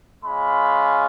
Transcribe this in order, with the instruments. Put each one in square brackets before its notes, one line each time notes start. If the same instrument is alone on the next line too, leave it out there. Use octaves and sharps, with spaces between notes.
[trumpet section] G#3 C#4 F4 B5